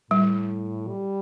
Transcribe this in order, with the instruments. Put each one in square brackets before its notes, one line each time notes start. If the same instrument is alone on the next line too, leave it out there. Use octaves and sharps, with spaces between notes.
[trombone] A2 [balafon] G3
[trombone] G3